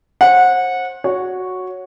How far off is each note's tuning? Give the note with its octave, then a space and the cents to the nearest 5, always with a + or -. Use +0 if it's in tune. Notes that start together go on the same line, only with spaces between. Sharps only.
C5 +30 F#5 -20
F#4 -5 C#5 +0